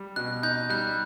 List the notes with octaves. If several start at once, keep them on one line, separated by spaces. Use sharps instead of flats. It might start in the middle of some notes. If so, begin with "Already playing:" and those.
Already playing: G3
B2 F#6
D#4 G6
G3 F#6